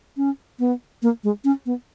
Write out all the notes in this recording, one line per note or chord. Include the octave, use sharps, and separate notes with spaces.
C#4
B3
A#3
G#3
C#4
B3